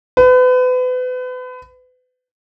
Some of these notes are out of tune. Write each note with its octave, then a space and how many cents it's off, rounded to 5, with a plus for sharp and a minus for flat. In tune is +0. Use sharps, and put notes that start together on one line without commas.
B4 +35